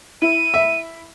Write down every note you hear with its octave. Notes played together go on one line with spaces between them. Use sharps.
E4 D#7
E5